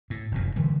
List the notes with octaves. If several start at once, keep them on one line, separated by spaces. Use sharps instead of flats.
A2
F1 F#2 A#2
D3 E3 G3